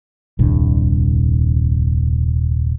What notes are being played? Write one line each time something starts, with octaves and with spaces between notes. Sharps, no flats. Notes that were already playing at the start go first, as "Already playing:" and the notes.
D#1 C2 G2